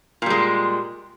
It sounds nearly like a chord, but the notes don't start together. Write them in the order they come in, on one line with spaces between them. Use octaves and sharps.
A#2 G3 G#3